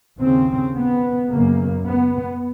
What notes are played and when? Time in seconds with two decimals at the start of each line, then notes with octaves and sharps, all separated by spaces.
0.20 D#2 C#3 C4
0.76 B3
1.30 F#2 C#3 A#3
1.85 B3